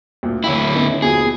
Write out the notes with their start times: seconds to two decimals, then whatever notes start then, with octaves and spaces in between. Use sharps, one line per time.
0.23 D2 A#2
0.44 D2 E4 C#5 E5 G5
0.75 B3 C#4 D#4
1.02 D#2 B2 F3 G#4